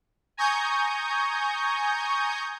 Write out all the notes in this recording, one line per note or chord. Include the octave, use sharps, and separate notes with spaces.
G#5 A#5 C#6 D#6 G6